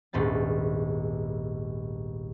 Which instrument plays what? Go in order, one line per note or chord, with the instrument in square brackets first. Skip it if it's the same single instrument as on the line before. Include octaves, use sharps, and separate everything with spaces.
[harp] D#1 A#1 G#2 B3 A6